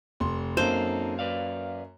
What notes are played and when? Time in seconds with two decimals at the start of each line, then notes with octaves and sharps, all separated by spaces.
0.20 F1 C6
0.57 F#2 A#3 C4 D#4 A4 C5
1.19 B4 D5 F5